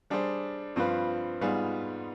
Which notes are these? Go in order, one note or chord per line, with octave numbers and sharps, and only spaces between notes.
G3 D4 G#4 C5
G2 F3 C4 F4 B4
G#2 G3 B3 F4 G#4